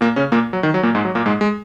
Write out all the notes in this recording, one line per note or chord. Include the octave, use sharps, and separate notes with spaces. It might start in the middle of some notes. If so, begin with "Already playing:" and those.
A#2 A#3
C#3 C#4
A#2 A#3
F#3
D#3
F#3
A#2 A#3
G#2 G#3
F#3
A#2 A#3
G#2 G#3
G#3